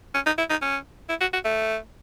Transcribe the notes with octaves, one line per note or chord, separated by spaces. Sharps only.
C#4
D#4
E4
D#4
C#4
E4
F#4
F#4
A3